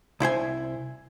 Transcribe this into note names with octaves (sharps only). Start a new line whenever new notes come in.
C2 E4 C5 G#5